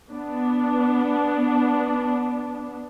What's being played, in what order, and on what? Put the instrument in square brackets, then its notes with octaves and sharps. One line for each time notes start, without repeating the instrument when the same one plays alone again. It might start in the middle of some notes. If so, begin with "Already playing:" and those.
[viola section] B3 D4